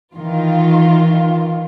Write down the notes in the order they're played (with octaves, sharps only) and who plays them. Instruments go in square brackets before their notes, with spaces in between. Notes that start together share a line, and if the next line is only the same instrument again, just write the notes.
[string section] D#3 E3 F4